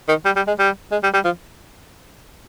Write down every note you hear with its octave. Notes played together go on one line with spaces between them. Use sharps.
D#3
G3
G3
G#3
G3
G#3
G3
G3
F3